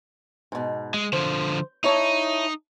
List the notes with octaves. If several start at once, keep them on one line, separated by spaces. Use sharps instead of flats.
G#2 B2
G#3
D3 F3 C5
D#4 E4 C#5 A5